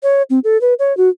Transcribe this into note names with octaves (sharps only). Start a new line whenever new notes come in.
C#5
C4
A4
B4
C#5
F#4